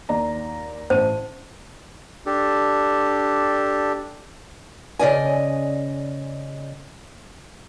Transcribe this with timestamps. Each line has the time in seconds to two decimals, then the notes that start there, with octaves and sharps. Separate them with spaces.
0.09 D#2 D5 A#5
0.90 A1 C5 A5 D#7
2.26 D4 G4 A4
4.99 C#3 D5 D#5 G#5